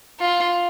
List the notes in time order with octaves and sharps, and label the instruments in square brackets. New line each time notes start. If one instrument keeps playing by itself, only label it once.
[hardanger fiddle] F4